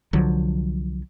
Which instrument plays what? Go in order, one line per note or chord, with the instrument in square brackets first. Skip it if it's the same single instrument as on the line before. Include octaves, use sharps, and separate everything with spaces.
[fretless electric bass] C2 D3 F3 F#3